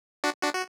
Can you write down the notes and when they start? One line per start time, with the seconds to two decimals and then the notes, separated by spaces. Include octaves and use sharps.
0.24 D4 F#4
0.42 D4 F#4
0.54 F#4